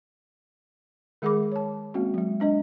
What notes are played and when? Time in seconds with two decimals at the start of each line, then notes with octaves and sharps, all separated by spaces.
1.22 D#3 G#3 G#4 F#5 B5 D6
1.52 C#5 A5
1.94 G#3 A#3 C4 C#4 F#4
2.14 F#3 G#3
2.40 G#3 D4 D#5